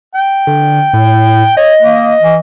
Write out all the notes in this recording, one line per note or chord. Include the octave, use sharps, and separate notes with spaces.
G5
D3
A2
C#5 D#5
A#3
E3